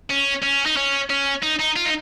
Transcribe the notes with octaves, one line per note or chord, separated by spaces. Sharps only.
C#4
C#4
D#4
C#4
C#4
D#4
D#4
F4
D#4